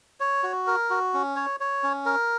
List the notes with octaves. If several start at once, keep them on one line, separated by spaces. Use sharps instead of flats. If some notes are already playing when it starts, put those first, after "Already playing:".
C#5
F#4
A#4
F#4
C#4
C#5
C#5
C#4
A#4